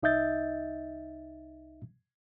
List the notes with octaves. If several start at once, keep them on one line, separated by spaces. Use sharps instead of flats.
C2 D#4 D#5 E5 G6 A6